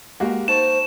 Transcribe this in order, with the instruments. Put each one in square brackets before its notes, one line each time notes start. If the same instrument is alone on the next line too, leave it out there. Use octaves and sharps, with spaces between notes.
[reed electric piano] G#3 G4 [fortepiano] A#3 F#4
[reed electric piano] D#4 A5 C#6 [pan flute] C5 [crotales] E7